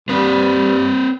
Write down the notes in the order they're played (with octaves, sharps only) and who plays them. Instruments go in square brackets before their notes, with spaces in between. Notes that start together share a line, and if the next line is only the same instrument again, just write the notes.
[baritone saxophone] G2 [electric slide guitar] C4 B4